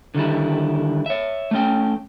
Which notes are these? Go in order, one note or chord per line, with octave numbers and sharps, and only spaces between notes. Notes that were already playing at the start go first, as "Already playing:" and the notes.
D3 D#3 G3 E4
C#5 E5
A3 C#4 G5